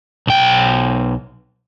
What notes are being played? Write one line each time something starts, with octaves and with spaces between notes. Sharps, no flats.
B1 G5